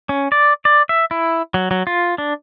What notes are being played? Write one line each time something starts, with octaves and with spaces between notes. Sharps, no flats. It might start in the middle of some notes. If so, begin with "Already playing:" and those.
C#4
D5
D5
E5
E4
F#3
F#3
F4
D4